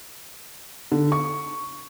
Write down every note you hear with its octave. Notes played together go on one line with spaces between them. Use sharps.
D3
C#6